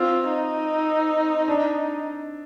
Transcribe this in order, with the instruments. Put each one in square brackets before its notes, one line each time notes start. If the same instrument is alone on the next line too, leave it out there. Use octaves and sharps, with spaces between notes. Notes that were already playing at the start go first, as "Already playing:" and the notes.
Already playing: [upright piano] C4 [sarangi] F4
[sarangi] D#4
[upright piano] D4